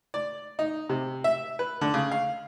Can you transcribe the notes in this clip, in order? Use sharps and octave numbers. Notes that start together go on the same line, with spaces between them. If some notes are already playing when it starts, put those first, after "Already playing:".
D5
D#4
C3
E5
B4
D3
C#3
F5